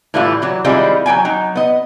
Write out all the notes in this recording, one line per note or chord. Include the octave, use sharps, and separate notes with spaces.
A2 E3 G3 E4 F4
E3 F#3
D#3 G3 G#3 C4 E4 F4
F#3 C#4 G5 G#5
F#3 D#4
B3 D#5